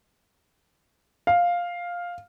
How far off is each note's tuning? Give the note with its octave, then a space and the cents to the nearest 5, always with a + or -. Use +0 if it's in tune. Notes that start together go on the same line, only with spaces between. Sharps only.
F5 +5